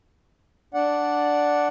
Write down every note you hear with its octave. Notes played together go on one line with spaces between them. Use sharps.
D4 D5 F#5